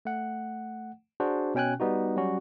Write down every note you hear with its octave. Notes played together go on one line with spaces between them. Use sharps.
A3 F#5
D4 F#4 G#4 C5
B2 C#4 G5 G#5 F#6
G3 B3 D#4 F#4
F#3 G3 C#4 F#4